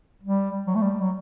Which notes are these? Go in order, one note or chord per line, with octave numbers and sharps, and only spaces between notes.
G3
F#3
A3
G3
F#3